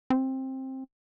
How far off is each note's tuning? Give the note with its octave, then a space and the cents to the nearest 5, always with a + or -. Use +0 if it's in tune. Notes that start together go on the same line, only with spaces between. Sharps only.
C4 +15